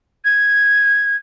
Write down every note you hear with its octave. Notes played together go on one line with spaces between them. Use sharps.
G#6